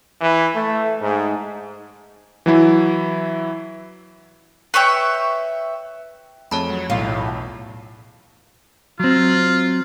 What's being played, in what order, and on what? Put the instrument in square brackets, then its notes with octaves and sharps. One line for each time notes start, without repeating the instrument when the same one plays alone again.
[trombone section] E3
A3
G#2
[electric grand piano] E3 F#3 E4
[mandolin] B4 C#5 E5 G5
[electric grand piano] F2 A3 G#4 [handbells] C#5 A5 B5
[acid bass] F#3
[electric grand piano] B1 E2 [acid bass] A2 [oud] F4
[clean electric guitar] F#3 C4 [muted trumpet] F4